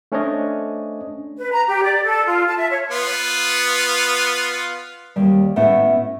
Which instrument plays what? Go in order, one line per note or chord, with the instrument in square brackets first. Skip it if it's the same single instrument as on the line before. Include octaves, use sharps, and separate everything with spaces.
[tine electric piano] A3 C#4 D4 C5 C#5 D#5
[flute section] B4
A#5
G4
D5
A4
F4
A5
E5
C#5
[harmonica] B3 F4
[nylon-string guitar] D#2 G3
A2 A3 B3 C#4 E4 F#5